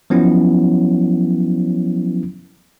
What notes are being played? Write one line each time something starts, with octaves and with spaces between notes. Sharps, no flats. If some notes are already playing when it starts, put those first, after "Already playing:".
F3 F#3 B3 C#4 E4